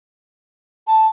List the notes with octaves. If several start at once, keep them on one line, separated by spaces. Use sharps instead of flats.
A5